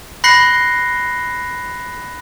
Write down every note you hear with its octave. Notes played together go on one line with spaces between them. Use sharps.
B5 F#6 A#6 C7 C#7 G7